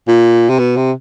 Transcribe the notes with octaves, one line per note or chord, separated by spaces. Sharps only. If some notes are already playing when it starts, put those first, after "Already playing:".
A#2
C3
B2
C3